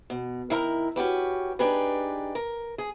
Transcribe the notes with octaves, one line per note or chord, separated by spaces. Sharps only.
B2
D#3 E4 A#4 A#5
C#4 F#4 G4 B4
D4 D#4 G4 G#4 B4
A#4
G#4